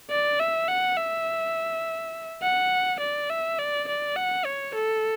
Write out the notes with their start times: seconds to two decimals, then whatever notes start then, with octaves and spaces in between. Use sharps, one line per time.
0.10 D5
0.39 E5
0.68 F#5
0.97 E5
2.42 F#5
3.00 D5
3.30 E5
3.58 D5
3.88 D5
4.16 F#5
4.45 C#5
4.75 A4